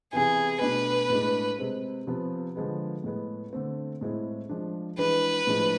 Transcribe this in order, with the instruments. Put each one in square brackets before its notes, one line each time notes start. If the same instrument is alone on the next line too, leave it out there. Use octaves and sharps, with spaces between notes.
[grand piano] C3 E3 B3 E4 [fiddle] G#4
[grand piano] B2 A3 D4 [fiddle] B4
[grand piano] A2 G#3 D4
C3 G#3 C4
C3 F3 B3
D3 F3 G#3 B3
A2 G#3 B3
D3 A3 C4
A2 G#3 C4 E4
F3 G#3 D4
[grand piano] E3 G#3 D4 [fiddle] B4
[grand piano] A2 F3 G#3 D4